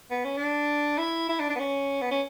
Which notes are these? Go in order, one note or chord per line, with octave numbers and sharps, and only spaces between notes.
B3
C#4
D4
E4
E4
D4
D4
B3
C#4
B3
C#4